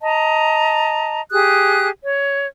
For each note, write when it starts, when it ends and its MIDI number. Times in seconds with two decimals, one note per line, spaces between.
0.01 1.21 75
0.01 1.21 81
0.01 1.21 82
1.31 1.89 67
1.31 1.89 68
1.31 1.89 87
1.31 1.89 90
2.03 2.46 73